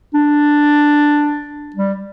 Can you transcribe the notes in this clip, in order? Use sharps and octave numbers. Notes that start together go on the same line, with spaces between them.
D4
G3